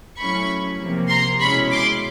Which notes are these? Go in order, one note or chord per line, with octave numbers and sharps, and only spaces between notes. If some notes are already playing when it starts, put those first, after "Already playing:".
F#3 A3 C#4 E4 B5 C#6
C3 F3 A#3
A#5 C6
B2 G#3 C#4 E4 B5 C#6
C6 D6